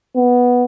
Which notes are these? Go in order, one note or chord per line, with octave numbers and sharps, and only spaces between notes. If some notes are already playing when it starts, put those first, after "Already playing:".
B3